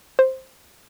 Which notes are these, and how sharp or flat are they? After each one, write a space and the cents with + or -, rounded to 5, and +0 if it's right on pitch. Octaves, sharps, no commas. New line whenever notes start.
C5 +5